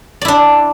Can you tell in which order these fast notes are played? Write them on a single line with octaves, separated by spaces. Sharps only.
D5 E4 D4